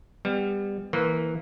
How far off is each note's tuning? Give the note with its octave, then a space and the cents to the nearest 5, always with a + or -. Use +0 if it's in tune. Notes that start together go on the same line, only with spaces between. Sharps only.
G3 +25 B3 +20
E3 -20 A#3 +0 C5 -30